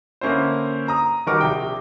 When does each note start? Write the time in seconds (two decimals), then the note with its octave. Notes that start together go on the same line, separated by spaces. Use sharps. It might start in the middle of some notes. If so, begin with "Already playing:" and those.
0.21 D3 A#3 C#4 E4 C5
0.88 A#5 D#6
1.27 D#3 G3 F#4 A#4 C#6 D6
1.41 A#1 C3 G5